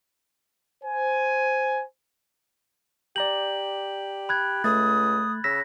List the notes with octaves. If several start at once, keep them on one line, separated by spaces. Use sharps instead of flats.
C5 G#5
G4 D5 A#5 G6 F#7
B5 F#6 G#6
C#2 A3 D#6 A6
C#3 E6 A#6 B6